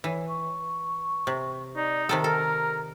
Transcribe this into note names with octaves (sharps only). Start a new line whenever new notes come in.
E3 C#5
C#6
C3
D#4 D5
C3 D#3 A4 A#5
A4 A#4